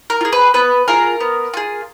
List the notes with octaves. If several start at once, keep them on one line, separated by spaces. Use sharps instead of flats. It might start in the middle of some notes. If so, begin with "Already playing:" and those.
A#4
F4
G#4
B4
B3 B4
F4 G#4 A#4
B3
F4 G#4